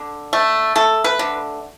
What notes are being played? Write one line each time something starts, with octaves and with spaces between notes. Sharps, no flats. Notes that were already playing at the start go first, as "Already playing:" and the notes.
Already playing: D3
A3
A3 A4
B4
D3